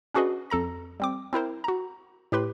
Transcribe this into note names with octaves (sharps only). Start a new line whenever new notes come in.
C#4 D4 F#4 G#4 B4 D#5
F2 A4 A#5 A#6
G3 C4 D6
C4 E4 A#4 C5
F#4 A#5
A2 G4 B4 C6